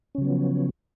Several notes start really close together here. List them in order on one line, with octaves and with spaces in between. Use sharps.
C#4 C#3 F#3 B3 F3